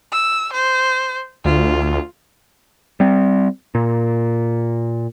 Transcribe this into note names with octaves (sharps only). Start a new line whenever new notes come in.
E6
C5
D2 F4
G3 C4
A#2